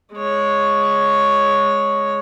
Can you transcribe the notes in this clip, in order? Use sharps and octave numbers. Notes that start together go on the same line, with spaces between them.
G#3 C#5